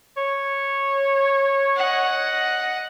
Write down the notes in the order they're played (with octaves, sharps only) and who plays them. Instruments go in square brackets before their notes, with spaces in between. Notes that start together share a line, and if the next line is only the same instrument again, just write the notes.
[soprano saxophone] C#5
[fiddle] D#5 F#5